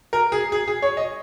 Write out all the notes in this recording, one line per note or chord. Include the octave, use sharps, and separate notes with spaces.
A#4
G#4
G#4
G#4
C#5
D#5